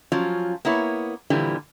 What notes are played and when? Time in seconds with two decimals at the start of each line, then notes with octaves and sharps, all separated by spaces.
0.12 F3 F#3 C#4 F4
0.65 A#3 B3 E4 C#5
1.30 A#2 D3 E3 F3 G3